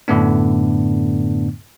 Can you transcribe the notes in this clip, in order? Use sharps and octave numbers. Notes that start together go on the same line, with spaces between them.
F#2 A2 D3 A3 B3 D4